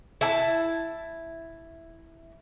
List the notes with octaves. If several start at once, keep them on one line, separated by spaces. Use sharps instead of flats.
E4 A5